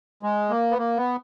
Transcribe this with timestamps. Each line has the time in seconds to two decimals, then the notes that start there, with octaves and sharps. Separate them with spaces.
0.23 G#3
0.50 A#3
0.71 B3
0.78 A#3
0.97 B3